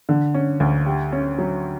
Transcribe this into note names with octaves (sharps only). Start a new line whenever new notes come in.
D3
C#4
D2
G4
C#4
F#3